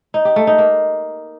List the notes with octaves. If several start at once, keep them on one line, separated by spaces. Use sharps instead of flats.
D#4
G4
A3
D#4
A#3